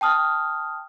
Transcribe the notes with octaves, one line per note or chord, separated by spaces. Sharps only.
G5 A5 D#6 F6